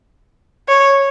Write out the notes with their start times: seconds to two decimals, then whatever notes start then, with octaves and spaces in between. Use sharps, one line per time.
0.69 C#5